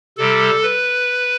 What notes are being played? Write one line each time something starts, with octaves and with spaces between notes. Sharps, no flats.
C3 G3 A4
B4